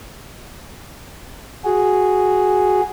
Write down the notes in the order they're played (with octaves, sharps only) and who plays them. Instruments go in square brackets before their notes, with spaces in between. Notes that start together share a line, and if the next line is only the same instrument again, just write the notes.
[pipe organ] F#4 G#4